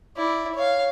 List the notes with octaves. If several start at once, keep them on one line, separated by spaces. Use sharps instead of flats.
E4 D5
C#5 F5